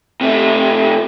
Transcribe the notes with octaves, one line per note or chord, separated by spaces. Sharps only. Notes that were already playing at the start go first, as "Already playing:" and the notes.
C3 A3